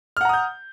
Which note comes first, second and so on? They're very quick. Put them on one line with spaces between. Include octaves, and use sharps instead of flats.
F6 F#5 A#5 D#6 G6